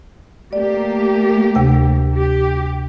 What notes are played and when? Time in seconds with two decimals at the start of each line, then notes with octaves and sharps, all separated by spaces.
0.53 A3 A#3 G4 D5
1.55 D2 C3 G5
2.13 G4